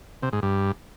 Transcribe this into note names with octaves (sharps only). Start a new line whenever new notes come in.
C3
G#2
G2